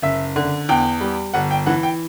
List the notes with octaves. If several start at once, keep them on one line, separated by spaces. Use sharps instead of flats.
F#1 E5
D3
E2 G5
G3
G1 F#5
G5
E3 F#5
G5